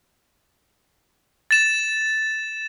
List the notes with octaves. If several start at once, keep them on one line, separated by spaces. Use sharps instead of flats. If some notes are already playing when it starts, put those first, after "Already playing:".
A6 E7